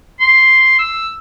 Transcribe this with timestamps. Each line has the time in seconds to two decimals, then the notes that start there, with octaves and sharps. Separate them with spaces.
0.20 C6
0.79 E6